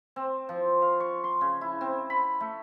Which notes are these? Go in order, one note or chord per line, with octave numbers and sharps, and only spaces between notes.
C4
F3
F5
C#6
C6
C#3
E4
C4
B5
A3